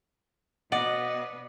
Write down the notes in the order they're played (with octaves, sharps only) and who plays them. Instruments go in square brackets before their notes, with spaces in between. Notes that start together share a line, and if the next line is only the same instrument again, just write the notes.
[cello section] B2 B3 [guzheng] D5 [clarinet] D#5 [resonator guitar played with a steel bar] F#5